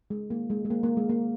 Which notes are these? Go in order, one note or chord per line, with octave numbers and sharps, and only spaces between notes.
G#3
A#3
G#3
G#3
A#3
A#3
G#3
A#3